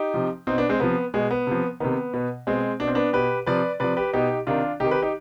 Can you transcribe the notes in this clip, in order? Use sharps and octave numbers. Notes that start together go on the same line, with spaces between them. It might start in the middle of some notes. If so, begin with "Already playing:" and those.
Already playing: D#4 G4
C3 F3
B2 C4 D#4
B3 D4
G#3 C4
C3 F3 B3
B2 G#3
B3
C3 F3
C3 D#3 B3
B2
B2 G#3 C4
B2 D4
C4
B3 D4
B2 G4 B4
C3 F3 B4 D5
C3 F3 B4 D5
G4 B4
B2 D#4 G4
C3 D#3 D4 F4
C3 D#3 D#4 G4
G4 B4
D#4 G4